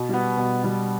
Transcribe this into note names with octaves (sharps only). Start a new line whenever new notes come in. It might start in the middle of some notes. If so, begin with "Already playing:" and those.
Already playing: B2
G3 B3
B2
G3 B3